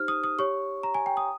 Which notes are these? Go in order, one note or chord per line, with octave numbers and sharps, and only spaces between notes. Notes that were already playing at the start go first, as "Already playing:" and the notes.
Already playing: D#4 G4 C5 F6
D#6
D#6
G4 C#5 C#6
A#5
G#5
G5
D#6